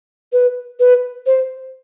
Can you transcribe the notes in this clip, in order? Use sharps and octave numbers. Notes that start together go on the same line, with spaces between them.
B4
B4
C5